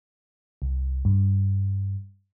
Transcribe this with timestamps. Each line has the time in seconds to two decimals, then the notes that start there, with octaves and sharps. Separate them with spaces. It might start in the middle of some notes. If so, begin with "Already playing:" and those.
0.62 C2
1.05 G2